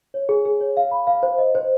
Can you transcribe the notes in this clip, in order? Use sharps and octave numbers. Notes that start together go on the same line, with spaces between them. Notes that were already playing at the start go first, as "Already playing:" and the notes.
C#5
G#4
G#4
C#5
F5
B5
F5
C5
D#5
C5